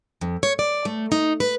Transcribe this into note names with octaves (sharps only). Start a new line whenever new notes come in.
F2
C#5
D5
A3
D#4
B4